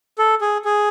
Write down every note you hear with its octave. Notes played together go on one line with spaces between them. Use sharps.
A4
G#4
G#4